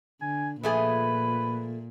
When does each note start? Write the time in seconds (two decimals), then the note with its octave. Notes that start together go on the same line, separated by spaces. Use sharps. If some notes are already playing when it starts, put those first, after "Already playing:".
0.21 D3 G#5
0.63 A#2 F3 A3 G#4 B4